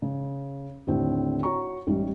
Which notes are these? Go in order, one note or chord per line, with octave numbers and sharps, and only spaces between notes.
C#3
D#2 A2 D3 C4
F#4 C#5 A#5 C#6
A1 G3 D#4